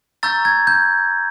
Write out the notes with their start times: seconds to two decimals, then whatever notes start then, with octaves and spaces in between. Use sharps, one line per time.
0.23 A#5 C#6 E6 G6 A6
0.45 G#6
0.67 G6